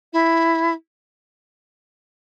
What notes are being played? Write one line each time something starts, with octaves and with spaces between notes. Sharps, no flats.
E4